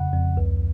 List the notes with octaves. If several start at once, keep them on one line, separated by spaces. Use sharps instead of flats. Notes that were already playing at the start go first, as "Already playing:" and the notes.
Already playing: F2 C#3 F#5
F2
C#2